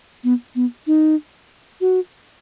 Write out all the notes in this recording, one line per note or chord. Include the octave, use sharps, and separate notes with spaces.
B3
B3
D#4
F#4